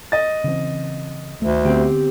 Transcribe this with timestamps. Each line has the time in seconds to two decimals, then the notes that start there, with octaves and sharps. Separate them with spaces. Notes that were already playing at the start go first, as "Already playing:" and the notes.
0.12 D#5 A6
0.44 C#3 E3 C4
1.42 D2 D#3 A3
1.65 D3 B3 C4 G4